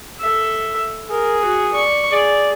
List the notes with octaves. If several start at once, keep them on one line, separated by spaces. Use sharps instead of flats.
A4 E5
G#4 A#4
F#4
D5 C#6
G#4 D5